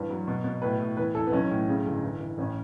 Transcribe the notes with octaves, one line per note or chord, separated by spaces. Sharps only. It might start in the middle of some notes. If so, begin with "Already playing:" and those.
Already playing: G2 E3 B4
F#3
B2
B2
A2 B4
A2
E3 B4
E3 A4
B3
B1 C#4
A2
C#3
G1
E3
E3
A1 C#4